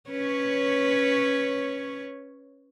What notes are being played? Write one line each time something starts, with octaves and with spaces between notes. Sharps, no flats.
C#4 B4 C#5